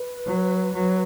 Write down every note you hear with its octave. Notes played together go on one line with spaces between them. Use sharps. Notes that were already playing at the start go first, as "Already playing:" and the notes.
Already playing: B4
F#3
F#3